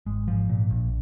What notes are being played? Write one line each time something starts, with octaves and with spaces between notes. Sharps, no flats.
G#1 G#3
G#2 F3
A#2
A#1